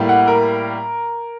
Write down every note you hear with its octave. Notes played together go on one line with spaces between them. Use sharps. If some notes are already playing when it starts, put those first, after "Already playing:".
Already playing: A2 G3 A#3
F#5
A#4